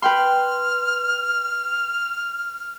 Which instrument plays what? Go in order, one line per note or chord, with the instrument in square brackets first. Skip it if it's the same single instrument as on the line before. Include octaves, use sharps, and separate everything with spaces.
[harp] B4 G5 C6 [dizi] F6